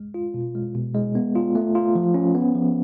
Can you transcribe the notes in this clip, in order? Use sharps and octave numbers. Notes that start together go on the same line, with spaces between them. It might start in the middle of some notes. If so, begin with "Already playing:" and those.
Already playing: G#3
F4
B2
G#3
B2
G#3
B3
F4
A3
F4
F3
C#4
B3
F3